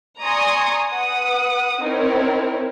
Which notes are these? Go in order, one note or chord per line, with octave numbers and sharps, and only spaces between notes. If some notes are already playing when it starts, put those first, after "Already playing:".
D5 G#5 A#5 C6 C#6 D#6
B4 F#5 D#6
C4 D#4 E4 A#4 C#5